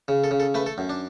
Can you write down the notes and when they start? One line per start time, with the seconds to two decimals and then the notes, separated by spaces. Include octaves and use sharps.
0.08 C#3
0.24 A4
0.31 C#3
0.40 A4
0.54 A3 B4
0.66 A4
0.78 F#2
0.90 D4